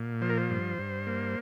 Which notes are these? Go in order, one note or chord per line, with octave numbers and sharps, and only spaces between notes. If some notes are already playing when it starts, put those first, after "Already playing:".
Already playing: A#2
F3 C5
A#4
C5
G2
G2
A#3